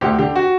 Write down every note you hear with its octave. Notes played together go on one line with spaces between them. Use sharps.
D2 G4
D3 G4
F#4